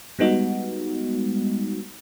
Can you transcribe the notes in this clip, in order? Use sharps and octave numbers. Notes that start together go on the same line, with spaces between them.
G3 G#3 B3 D#4 F#4